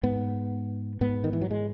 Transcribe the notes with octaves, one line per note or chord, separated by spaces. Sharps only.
G#2 B3
G#2 B3
D#3
E3
F#3
G#3